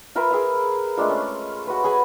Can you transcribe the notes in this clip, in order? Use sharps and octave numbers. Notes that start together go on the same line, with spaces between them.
F4 A#4 B4 E5
G#4 E5 F5
G#3 A3 D4 F4
C#4
F#4 B4
G#4 F#5 G#5 B5